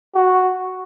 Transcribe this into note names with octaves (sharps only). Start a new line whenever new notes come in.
F#4